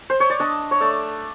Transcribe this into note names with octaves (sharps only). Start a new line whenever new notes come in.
C5
C#5
D5
D4 D#5
C#5
A3 D5